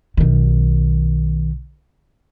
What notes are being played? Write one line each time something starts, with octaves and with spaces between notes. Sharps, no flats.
B1 D#3